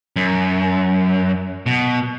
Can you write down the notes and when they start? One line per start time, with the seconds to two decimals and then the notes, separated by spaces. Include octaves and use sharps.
0.16 F#2
1.66 B2